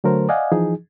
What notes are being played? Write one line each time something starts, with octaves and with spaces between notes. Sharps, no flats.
D3 F#3 A3 A#4 C5
D5 D#5 F5 F#5 G#5
E3 F3 D#4 G#4